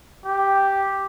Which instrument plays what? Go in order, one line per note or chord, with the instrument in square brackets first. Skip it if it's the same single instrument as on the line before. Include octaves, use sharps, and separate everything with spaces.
[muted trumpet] G4